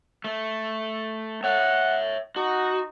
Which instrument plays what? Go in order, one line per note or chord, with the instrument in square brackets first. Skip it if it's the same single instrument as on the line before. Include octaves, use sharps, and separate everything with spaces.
[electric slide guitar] A3
[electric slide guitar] C#5 E5 [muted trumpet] F#5
[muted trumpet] D#4 [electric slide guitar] F#4